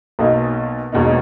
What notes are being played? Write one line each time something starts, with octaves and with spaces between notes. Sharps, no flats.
B1 B2 A#3 D#4
E1 E2 B2 A#3 D#4